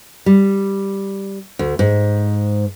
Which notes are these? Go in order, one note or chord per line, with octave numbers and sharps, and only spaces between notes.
G3
D2
G#2